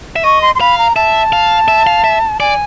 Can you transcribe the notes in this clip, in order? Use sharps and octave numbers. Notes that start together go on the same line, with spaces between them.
E5
D#5 C#6
C6
C6
F5 B5
A#5
E5 A5
F5
E5
F5
E5
D5 G#5